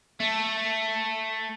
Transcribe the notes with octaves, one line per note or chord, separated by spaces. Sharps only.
A3